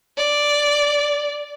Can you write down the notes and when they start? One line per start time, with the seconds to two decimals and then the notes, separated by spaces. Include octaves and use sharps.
0.17 D5